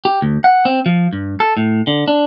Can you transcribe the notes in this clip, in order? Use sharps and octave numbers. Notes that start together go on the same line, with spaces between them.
G4
D2
F#5
C4
F3
G2
A4
A2
D3
D4